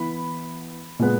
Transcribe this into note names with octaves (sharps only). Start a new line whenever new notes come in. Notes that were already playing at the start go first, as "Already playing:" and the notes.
Already playing: E3 B3 B5
A#2 G#3 B3